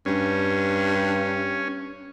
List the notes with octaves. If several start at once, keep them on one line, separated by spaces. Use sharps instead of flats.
G2 C#4